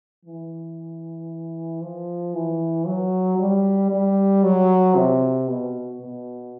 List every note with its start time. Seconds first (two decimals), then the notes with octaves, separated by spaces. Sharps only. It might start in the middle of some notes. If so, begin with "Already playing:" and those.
0.25 E3
1.82 F3
2.34 E3
2.86 F#3
3.39 G3
3.91 G3
4.43 F#3
4.95 C3
5.48 B2
6.01 B2